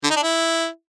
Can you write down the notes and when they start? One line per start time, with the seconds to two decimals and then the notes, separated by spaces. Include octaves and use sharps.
0.04 D3
0.10 D#4
0.16 D4
0.23 E4